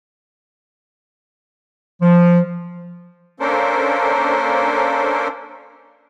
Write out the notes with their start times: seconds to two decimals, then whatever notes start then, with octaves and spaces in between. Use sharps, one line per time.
2.01 F3
3.40 A#3 C#4 D4 A4 A#4 C5